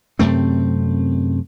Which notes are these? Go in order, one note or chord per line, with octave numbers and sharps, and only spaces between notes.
F#2 C3 A3 C4